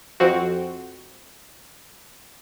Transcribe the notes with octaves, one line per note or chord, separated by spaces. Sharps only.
F2 C4 F#4